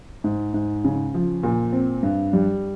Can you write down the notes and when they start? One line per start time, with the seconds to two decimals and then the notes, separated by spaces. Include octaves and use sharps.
0.24 G#2
0.54 G#2
0.84 C#3
1.14 F3
1.43 A#2
1.72 C4
2.03 G2
2.33 G3